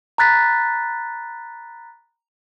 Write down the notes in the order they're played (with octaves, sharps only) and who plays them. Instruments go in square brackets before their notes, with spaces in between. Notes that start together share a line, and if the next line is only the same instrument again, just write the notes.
[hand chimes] A#5 B5 F#6 A6 B6